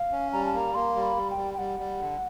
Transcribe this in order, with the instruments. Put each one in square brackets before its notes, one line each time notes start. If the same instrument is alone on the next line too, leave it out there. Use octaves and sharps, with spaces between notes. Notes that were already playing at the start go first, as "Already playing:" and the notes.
Already playing: [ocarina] F5
[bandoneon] C#4
[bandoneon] G3 [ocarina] A#5
[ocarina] A5
[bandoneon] A#3 [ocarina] A#5
[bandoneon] A#3 [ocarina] C6
[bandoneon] G3
[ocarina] B5
[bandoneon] G3
[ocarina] G5
[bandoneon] G3
[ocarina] G5
[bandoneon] G3 [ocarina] F#5
[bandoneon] G3
D3